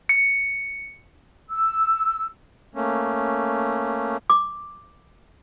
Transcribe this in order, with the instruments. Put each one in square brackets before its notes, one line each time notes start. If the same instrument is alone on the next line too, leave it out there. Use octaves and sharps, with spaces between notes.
[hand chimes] C#7
[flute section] E6
[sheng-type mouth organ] A3 A#3 C#4
[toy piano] D6